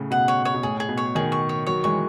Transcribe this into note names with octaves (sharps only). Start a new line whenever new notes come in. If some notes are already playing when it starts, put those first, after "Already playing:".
Already playing: A2 C#3
B2 F#5
C#5
C#5
B2
A2 G#4
G#4
B2
C#5
B2 D#3 G#4
C#6
C#5
D#3 F#3 C#5
E3 G#3 C#6